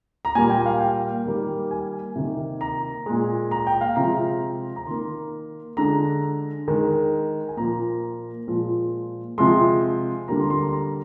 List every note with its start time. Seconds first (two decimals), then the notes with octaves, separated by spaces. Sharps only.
0.25 A#5
0.35 A#2 G3 A#3 G#5
0.50 G5
0.66 F5
0.80 G5
1.25 D#3 G3 A#3
1.71 G#5
2.16 C3 D#3 A#3
2.61 A#5
3.06 A#2 G#3
3.51 A#5
3.67 G5
3.81 F5
3.96 C3 F3 G#3 A#5
4.76 A#5
4.86 D#3 A#3 C6
5.77 D3 G#3 A#5
6.68 D#3 G#3
7.48 G#5
7.57 A#2 F3 A#3 A#5
8.48 A#2 F3 G#3
9.38 C3 F3 G#3 C6
10.28 D3 G3 A#3 A#5
10.39 C6
10.50 C6
10.62 A#5
10.73 A#5